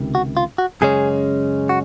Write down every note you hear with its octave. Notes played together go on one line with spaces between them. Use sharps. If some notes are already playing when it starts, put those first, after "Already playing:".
Already playing: C#2 C3 D#3
F#4
F4
F#4
F#2 C#3 G#3 C#4 G#4
F#4